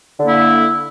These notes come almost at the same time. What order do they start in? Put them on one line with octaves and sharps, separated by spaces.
D3 A#3 E4